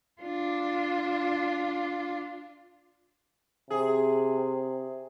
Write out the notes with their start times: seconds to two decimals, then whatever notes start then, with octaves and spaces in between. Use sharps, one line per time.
0.22 D4 F4
3.70 C3 G#4